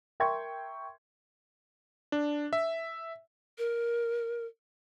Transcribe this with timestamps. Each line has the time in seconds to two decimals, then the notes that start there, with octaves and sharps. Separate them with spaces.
0.20 A#4 E5 G5 C6 C#6 G#6
2.12 D4
2.53 E5
3.58 A#4